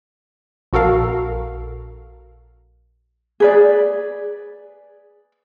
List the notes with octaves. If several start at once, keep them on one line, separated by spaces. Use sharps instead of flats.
A#1 F#4 A4 A#4 F5
G#4 B4 D5